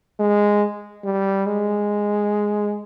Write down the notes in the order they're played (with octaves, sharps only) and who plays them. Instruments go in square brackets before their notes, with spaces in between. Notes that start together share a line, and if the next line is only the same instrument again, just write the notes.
[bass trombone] G#3
G3
G#3